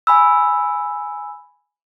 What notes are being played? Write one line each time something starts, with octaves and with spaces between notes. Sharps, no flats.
G#5 B5 E6